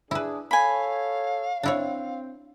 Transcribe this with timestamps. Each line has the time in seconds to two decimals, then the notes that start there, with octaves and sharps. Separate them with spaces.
0.11 D4 E4 G#4 B4
0.51 A4 C#5 F5 G#5 B5
1.63 C4 D4 E4 C#5